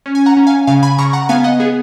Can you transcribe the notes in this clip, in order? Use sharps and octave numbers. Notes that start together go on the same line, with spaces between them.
C#4
G#5
F#5 A#5
C#4
F5 G#5
C#3 F5 G#5
G#5 B5
C#3 A#5 C#6
F#5 A#5
B3 F5 G#5
D#5 F#5
B3 G#4